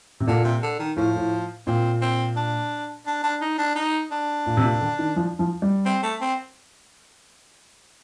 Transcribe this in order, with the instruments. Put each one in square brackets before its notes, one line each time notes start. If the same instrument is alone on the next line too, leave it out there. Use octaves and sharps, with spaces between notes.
[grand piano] C3
[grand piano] A#2 [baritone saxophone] D3
[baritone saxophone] C3
D3
D#3
[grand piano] A2 [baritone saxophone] F3
[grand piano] A2
[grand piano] A#2 [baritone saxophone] C4
[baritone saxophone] C4
D4
D4
D4
D#4
D4
D#4
D4
[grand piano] A#2
C3
A#2
D3
D#3
F3
F3
G3
[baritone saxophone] C4
A3
C4